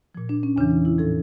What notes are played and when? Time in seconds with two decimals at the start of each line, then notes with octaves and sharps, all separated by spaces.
0.15 A#2 F3
0.29 D4
0.43 C#4
0.56 E2 C#3 E3 D4
0.70 D#4
0.85 E4
0.99 A2 F3 A4